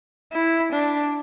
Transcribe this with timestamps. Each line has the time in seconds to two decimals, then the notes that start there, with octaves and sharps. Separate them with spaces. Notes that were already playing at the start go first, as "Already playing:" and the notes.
0.33 E4
0.72 D4